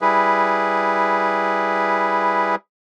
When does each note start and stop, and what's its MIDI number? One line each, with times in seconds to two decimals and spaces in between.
0.01 2.55 55
0.01 2.55 64
0.01 2.55 68
0.01 2.55 71